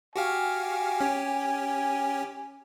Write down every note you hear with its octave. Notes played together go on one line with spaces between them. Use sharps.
F#4 G4 F5 G#5
C#4 G4